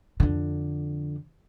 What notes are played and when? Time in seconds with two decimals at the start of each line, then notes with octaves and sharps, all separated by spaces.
0.20 F2 D3